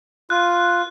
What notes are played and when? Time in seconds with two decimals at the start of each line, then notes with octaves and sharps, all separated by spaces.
0.30 F4 F#6